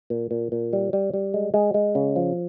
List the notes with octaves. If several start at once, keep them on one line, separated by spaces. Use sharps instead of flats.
A#2
A#2
A#2
G3
G3
G3
G#3
G#3
G#3
C#3
F3